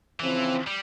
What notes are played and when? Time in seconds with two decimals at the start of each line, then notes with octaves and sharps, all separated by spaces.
0.20 C#3 E3 F3 C4 E4
0.67 G3